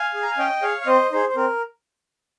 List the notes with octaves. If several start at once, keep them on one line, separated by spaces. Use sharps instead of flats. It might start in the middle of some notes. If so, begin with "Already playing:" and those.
Already playing: F5 G#5
G#4
A#5
G#5
C#4 D#5 G5
G#4 C#5 F5
F5
C4 C5 D#5
D#4 G#4 C5
C5
C4 A#4